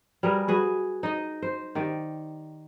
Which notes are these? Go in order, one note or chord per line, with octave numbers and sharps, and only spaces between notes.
G3 G#4 A#4 B4
F#4 G#4 B4
D#4 D#5
C5
D#3 G4 D5